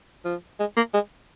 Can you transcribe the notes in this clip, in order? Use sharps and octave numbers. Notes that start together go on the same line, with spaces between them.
F3
G#3
A#3
G#3